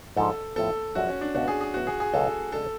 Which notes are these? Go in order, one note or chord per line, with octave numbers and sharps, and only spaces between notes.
G#2 F3 G#3 D4 A4
A2 F3 B3 A4
F#2 F3 G#3 D4 F#4
C#4
D4
C#2 B2 G#3 B3 F#4
G#4
G#4
A2 F#3 B3 F#4
G#4
G#4
C#2 B2 F#3 A3 A4
C#3 G#3 D4 A4